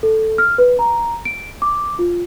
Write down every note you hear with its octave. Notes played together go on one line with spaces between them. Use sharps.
A4
F6
B4
A#5
D7
D6
F4